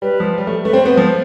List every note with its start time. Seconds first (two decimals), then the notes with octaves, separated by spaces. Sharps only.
0.02 G3 B4
0.20 F3
0.38 G3
0.47 A3
0.65 A3 B4
0.73 C4 C5
0.85 B3
0.97 F3